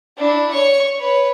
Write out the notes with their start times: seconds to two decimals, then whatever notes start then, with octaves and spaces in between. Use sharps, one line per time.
0.18 D4 E4
0.51 C#5 C#6
0.99 B4 C#5